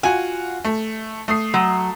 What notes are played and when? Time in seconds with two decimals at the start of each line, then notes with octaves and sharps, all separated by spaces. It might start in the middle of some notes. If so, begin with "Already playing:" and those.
0.03 F4 F#4 G#5
0.65 A3
1.28 A3 D#6 C7
1.54 F#3